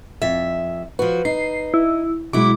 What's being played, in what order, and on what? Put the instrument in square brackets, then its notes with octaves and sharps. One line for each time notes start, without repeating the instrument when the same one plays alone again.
[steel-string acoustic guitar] F2 E5
[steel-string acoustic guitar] F3 F#4 [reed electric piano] B4
[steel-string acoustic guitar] D#4 [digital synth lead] C7
[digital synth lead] E4
[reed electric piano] B2 G#3 [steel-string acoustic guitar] F#3 E4 [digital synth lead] D6